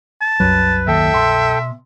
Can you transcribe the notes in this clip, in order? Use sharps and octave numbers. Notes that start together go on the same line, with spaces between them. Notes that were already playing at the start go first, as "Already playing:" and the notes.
A5
C2 F#2 F#3 B4
D#2 A4 E5 G5
B2 C6